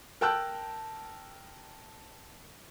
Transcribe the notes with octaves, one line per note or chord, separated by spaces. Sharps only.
A#4 G5 A5 E6 F#6 G6